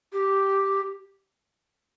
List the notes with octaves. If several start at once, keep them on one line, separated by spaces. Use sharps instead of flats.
G4